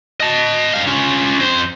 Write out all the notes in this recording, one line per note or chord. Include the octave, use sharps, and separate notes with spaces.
D#5 A5
G3 F5
C#4 F4
F2 C5